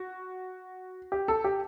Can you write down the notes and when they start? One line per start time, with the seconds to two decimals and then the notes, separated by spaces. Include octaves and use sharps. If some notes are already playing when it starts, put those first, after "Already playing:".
Already playing: F#4
1.12 G4
1.28 A4
1.44 G4